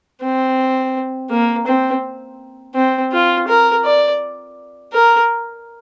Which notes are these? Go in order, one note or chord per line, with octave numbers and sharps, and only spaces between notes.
C4
A#3
C4
C4
F4
A#4
D5
A#4